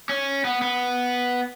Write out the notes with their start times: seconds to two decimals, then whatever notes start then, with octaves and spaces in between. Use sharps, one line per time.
0.09 C#4
0.44 B3
0.62 B3